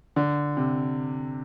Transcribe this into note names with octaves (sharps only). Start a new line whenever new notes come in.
D3
C3